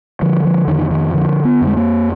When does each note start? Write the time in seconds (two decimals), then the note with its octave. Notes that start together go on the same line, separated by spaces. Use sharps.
0.22 D3 F3
0.45 F3
0.68 F2 D#3
0.91 D#3
1.14 D3 F3
1.45 B3
1.61 F2
1.67 G#3
1.77 A#3